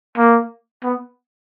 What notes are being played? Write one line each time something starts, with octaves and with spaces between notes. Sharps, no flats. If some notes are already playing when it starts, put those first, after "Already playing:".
A#3
B3